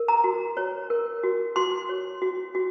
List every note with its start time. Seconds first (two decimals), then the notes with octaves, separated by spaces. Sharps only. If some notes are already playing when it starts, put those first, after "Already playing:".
Already playing: A#4
0.08 A#5
0.24 F#4
0.57 C#5
0.90 A#4
1.23 F#4
1.56 F#4 C6
1.89 C#5
2.22 F#4
2.55 F#4